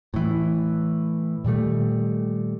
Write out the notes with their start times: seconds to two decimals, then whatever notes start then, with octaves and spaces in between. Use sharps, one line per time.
0.14 A2 E3
1.45 A#2 D#3 G3 A3